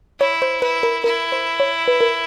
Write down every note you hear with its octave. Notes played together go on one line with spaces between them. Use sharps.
E4 C#5
C5
E4 B4
A#4
E4 A#4
C5
C#5
B4
A#4